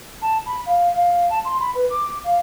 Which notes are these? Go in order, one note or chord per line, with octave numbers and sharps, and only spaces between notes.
A5
B5
F5
F5
A5
C6
B5
B4
D6
F5